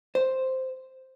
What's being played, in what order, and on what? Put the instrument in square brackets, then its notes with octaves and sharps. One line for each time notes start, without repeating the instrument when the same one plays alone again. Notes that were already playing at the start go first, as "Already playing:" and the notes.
[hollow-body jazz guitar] C5